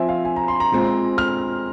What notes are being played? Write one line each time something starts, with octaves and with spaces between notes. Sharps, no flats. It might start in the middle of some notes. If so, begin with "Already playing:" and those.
Already playing: F3 C4 E5 G#5
F5
G#5
A#5
C6
A#5
A#2 G#3 C4
F6